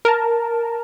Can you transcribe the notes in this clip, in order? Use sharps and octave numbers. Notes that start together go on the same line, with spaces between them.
A#4 A5